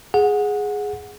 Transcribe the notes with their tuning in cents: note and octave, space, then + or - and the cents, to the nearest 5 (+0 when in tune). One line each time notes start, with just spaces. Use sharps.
G#4 +0 F#5 -20